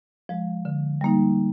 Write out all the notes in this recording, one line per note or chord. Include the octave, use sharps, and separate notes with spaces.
F3 G#3
D3
G3 A#3 D#4